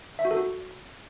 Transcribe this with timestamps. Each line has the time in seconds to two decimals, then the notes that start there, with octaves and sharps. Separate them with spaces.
0.19 E5
0.25 F#4
0.31 A4
0.37 F#4